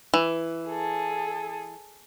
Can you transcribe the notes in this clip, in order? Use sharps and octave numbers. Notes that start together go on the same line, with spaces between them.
E3
G#4 A4